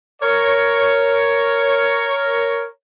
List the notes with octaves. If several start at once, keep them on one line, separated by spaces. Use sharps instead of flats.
A#4 C#5